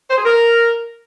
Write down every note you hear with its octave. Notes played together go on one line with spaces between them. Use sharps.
C5
G#4
A#4